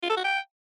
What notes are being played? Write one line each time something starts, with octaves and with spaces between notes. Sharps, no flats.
F4
A4
F#4
G5